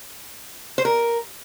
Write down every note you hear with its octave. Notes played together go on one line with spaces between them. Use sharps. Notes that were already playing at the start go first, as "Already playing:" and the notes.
C5
A#4